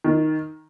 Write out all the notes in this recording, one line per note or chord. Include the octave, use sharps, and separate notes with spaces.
D#3